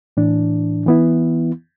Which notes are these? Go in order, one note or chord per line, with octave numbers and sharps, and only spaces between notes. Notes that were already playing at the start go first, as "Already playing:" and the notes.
A2 E3 D4
E3 B3 E4